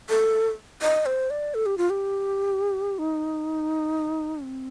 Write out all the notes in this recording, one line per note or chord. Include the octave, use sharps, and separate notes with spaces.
A4
D#5
C5
D5
A4
G4
F4
G4
D#4
C4